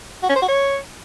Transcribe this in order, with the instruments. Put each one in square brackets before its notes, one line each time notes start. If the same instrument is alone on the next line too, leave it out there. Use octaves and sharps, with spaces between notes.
[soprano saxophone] F#4
C#4
C5
F#4
C#5